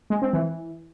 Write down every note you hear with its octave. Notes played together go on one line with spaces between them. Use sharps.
G#3
C4
E3